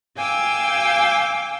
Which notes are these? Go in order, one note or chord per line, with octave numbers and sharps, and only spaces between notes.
F5 G5 G#5 D6 E6